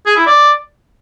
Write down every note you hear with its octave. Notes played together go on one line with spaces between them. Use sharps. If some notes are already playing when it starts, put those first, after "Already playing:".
G#4
E4
D5